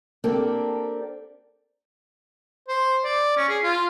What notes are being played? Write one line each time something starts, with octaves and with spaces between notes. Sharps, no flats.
A#3 C4 D4 G4 A4
C5
D5
C#4
G#4
F4